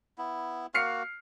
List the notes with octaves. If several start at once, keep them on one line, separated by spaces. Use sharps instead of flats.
B3 E4
A#3 F#4 F6 C7 C#7